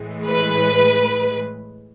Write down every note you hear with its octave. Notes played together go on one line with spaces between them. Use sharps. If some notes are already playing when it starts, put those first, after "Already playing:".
Already playing: A2 E3 G#3
B4